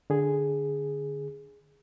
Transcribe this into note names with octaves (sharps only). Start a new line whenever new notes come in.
D3 G#4